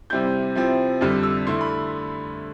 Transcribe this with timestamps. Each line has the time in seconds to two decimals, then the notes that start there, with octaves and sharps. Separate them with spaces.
0.10 C3 G3 C4 E4 G6
0.55 C3 F3 C4 E4
1.01 F2 D3 G3 F6
1.23 E6
1.47 D3 A3 E4 C6
1.61 B5